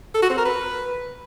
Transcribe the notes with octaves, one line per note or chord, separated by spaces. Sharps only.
A4
F#4
C4
A#4
B4